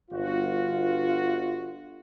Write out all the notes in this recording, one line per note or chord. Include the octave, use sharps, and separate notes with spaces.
G1 F4 F#4